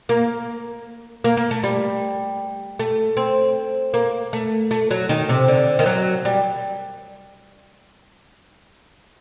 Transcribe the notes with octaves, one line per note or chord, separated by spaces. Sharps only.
A#3
A#3
A#3
A3
G3
A3
C4
A#3
A3
A3
F#3
D#3
C3
D3
D#3
F#3
G3